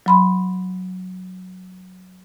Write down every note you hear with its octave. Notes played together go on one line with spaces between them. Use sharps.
F#3 B5 C6